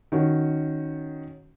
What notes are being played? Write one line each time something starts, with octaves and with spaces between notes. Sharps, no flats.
D#3 C#4 F#4